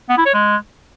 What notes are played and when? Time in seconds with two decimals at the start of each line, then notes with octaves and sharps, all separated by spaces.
0.09 B3
0.17 E4
0.26 C#5
0.34 G#3